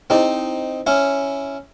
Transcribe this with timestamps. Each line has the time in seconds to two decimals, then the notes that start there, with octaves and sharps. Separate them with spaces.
0.10 C4 D#4 E4 G#4 C5 D#5
0.87 C#4 E4